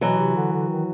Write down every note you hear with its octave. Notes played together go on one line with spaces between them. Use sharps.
B2 E3 F#3
C3
D3
D3
D#3